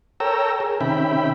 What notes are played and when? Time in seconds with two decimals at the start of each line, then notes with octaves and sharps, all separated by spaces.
0.20 A4 A#4 C#5 G5 A#5 E6
0.60 G#4 A#4
0.81 C3 D#3 C#4 E5 G5 B5